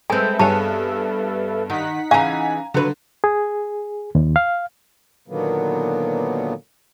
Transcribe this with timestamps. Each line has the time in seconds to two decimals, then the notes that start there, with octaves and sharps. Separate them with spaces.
0.10 G#3 C4 A4 B4 E5 G#5
0.39 G2 B3 G#4 C#5 A5
1.70 D#3 D#4 F#5 B6
2.11 C#3 E3 F5 G#5 A#5
2.74 D3 F#3 B4
3.24 G#4
4.15 D#2
4.36 F5
5.28 A#2 D3 D#3 F#3 A#3 B3